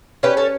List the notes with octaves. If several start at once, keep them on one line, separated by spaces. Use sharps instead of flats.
C#4 G4 B4
A4 C#5